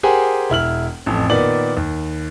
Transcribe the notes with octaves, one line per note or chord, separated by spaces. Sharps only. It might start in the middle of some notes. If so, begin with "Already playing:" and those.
G4 G#4 A#4 C5 F#5 G#5
E1 E4 F6 F#7
A1 F2
A#2 D#3 B3 D5 F#7
D#2